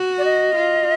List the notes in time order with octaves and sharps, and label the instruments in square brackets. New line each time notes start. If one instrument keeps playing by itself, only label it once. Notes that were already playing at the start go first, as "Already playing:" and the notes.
Already playing: [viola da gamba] F#4
[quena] D5
D#5
[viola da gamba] F4